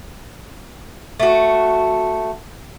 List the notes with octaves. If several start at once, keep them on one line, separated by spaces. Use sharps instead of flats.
A3 F#4